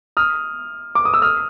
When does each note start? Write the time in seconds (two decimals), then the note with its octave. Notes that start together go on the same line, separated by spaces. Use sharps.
0.17 D#6 F6
0.95 D6
1.05 D#6
1.14 E6
1.22 D#6 F6